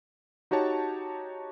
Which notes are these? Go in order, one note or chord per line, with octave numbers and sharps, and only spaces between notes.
D#4 F#4 G4 C#5 A5